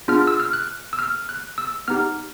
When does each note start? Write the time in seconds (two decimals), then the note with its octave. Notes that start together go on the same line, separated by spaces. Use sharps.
0.08 B3 D4 F4 G#4 F6
0.27 E6
0.40 F6
0.53 F#6
0.93 E6
0.99 F6
1.29 F#6
1.58 E6
1.88 B3 D#4 G4 F6